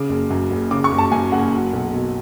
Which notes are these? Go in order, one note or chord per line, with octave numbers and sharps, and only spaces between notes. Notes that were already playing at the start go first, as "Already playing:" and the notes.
Already playing: C#3 D6
F#1
F#2
F#1
C#3 D6
C#6
F#1
A5
F#2 G#5
F#1 F#5
F#3
B1
B2